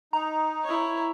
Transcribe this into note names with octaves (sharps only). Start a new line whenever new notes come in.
D#4 A#5
E4 C#5